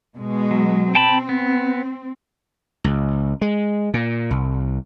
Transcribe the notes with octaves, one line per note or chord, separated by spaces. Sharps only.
B2 G#3
F#3
C4 G5 A5 B5
B3
C#2
G#3
A#2
C2